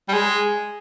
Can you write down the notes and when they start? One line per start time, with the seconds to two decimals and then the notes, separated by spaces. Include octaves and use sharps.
0.08 G3
0.13 G#3